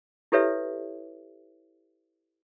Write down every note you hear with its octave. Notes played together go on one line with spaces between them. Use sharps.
E4 G4 A4 B4 C#5 E5